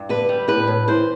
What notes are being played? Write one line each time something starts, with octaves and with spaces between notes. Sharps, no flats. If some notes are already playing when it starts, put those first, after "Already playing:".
Already playing: G2
D3 B4
G3
A2 B4
A2
E3 C5